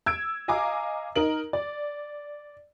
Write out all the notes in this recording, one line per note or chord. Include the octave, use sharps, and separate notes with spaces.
E6 G#6 D7
D#5 F5 G#5 A#5 D6
D#4 A#4 F#7
D5